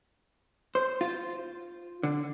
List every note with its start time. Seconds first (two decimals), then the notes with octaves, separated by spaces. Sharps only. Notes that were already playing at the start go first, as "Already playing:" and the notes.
0.75 C5
1.01 F4
2.03 D3